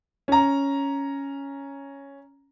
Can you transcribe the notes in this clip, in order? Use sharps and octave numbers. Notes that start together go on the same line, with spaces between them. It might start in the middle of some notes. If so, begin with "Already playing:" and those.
C#4 A#5